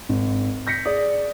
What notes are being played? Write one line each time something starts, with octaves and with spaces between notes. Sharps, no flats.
G#1
G6 A#6 B6 C#7
G#4 D5 D#6